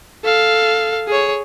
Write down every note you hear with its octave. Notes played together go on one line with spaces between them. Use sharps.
A4 F5
G#4 C#5